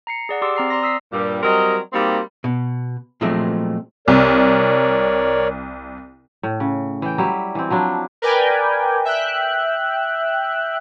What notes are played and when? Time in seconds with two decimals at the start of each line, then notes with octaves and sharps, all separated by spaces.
0.07 A#5 C7 C#7
0.29 G#4 D5 F#5
0.42 G4 D5 C6 D6 E6
0.56 C4 A#5 C7
0.70 D5 A#5 C6 A#6
0.83 D#6 E6 B6 C7
1.13 G2 A#2 G3
1.43 F#3 G3 C4 A#4 D#5
1.93 G3 A#3 C4 D#4 F#4 G4
2.44 B2
3.21 A#2 F3 F#3 G#3 A3 C4
4.08 C2 A#4 C#5 D5
6.43 A2
6.60 C#3
7.02 E3 G5
7.18 F#3 G3 E4
7.55 E3 C4
7.70 F3 F#3 D4 E4
8.22 A#4 B4 D5 G5 G#5
9.05 E5 G5 F#6